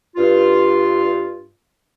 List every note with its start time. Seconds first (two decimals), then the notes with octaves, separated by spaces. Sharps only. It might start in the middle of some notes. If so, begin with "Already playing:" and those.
0.16 G2 F4